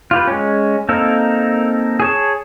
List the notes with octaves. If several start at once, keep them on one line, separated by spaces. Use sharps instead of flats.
F4 G4 B4
G#3 C#4
A#3 C4 D#4 A4 A#4
G#4 C#5 A5